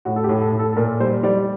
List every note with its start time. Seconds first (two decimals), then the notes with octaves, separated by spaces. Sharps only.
0.05 A2 F#4
0.16 A4
0.24 G4
0.29 A2
0.42 A4
0.53 A2
0.59 A4
0.73 A4
0.77 A#2 A#4
1.00 G3 C5
1.23 G3 D5